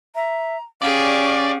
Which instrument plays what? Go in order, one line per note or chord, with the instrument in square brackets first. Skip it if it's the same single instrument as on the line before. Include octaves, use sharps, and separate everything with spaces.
[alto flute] E5 [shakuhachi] A#5
[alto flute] C#4 [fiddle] G4 G#4 [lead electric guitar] D5 [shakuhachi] F5